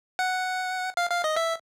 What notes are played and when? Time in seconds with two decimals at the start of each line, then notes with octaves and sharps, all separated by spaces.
0.19 F#5
0.97 F5
1.10 F5
1.24 D#5
1.36 E5